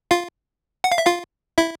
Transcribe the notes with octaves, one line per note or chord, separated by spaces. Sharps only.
F4 F5
F#5
F5
E5
F4 F5
E4 E5